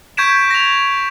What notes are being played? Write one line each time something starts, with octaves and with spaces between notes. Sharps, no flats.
C#6 G6 G#6 B6 D7 E7
A#6 F7